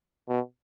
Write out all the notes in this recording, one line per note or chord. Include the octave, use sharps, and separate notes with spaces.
B2